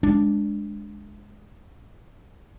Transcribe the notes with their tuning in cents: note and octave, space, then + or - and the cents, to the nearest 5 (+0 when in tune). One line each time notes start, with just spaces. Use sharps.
G#3 +0 D4 +0